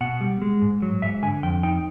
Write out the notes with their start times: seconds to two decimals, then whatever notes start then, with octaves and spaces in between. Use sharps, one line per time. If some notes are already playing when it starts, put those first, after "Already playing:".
0.01 B2 F#5
0.21 G3
0.42 G#3
0.62 G#2
0.82 F#3
1.02 G#2 E5
1.22 D3 G#5
1.43 F2 G5
1.63 D#4 G5